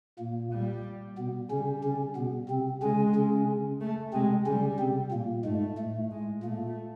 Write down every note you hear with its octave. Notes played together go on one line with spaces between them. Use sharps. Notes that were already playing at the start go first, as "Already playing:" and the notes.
A#2 A#3
G3
B2 B3
C#3 G3 C#4
C#3 C#4
B2 B3
C3 C4
C#3 G#3 C#4
C#3 C#4
A3
C3 G#3 C4
C#3 G3 C#4
C3 C4
A#2 A#3
G#2 G#3 A3
A2 A3
G#3
A#2 A3 A#3